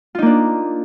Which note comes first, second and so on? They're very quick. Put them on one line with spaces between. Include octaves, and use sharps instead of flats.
F4 D#4 A#3 D4